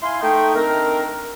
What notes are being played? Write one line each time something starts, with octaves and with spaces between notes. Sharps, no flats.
E4 F5 G#5 C6
A3 D#4 G5
D#3 C4 D4 A#4